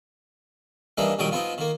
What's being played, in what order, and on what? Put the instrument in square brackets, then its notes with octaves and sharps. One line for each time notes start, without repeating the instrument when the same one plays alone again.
[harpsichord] G2 E3 G3 A#3 D4 D#4
A#1 D#3 F#3 G3 G5 D#6
F3 B3 C4 D#4
D#3 A#3